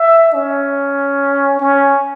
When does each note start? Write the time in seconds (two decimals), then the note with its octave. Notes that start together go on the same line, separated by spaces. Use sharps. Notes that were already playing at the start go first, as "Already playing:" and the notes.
Already playing: E5
0.34 C#4
1.60 C#4